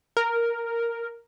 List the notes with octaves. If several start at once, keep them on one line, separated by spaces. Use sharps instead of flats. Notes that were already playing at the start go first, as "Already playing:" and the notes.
A#4